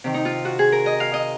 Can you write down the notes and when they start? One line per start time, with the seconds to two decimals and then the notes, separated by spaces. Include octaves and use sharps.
0.04 C3 D#3
0.14 D#4
0.25 F4
0.45 F#4
0.59 G#4
0.72 A#4
0.86 D#5
1.00 F5
1.14 D#5